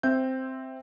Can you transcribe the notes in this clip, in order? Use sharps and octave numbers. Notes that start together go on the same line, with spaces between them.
C4 E5 G6